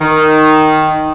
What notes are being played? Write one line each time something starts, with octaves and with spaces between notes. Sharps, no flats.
D#3